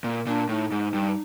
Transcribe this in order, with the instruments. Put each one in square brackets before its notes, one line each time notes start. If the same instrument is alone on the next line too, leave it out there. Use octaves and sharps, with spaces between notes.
[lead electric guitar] A#2
[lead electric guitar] A#2 [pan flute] D4
[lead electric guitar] A2 [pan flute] D#4
[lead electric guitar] G#2
G2